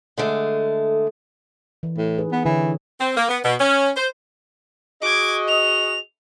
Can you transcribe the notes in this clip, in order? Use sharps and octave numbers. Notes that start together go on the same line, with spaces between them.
D3 G#3 A3
E3
A2
D#4 G#4 B4
B3
D3 E3 C4 C#5
C4
A#3
B3
B2
C#4
C5
F#4 G#4 D#5 D6 G#6
F7